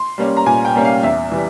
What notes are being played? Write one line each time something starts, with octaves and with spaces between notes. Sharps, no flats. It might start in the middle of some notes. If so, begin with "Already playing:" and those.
Already playing: C6
G3 A#3 C#4
A#5
A#2 G#5
G5
G3 A#3 C#4
F5
E2 E5
E3 G3